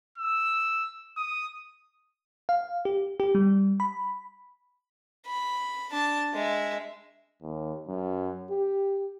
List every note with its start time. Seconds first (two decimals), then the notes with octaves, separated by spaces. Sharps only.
0.18 E6
1.17 D#6
2.49 F5
2.85 G4
3.20 G4
3.35 G3
3.80 B5
5.26 B5
5.91 D4 A5
6.33 G#3 E5
7.42 D#2
7.88 F#2
8.51 G4